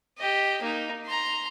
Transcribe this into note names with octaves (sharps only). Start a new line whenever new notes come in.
G4 D#5
A#3 D#4
A#5 C6